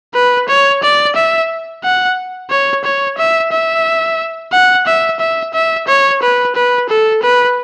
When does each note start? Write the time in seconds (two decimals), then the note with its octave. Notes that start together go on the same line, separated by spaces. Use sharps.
0.14 B4
0.48 C#5
0.83 D5
1.16 E5
1.84 F#5
2.50 C#5
2.84 C#5
3.18 E5
3.52 E5
4.52 F#5
4.86 E5
5.20 E5
5.54 E5
5.88 C#5
6.22 B4
6.55 B4
6.89 A4
7.22 B4